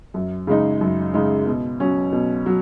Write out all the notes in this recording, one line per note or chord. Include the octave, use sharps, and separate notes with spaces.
F#2
C#3 G#3 D#4
F#2
C#3 G#3 D#4
B2
F#3 C#4
B2
F#3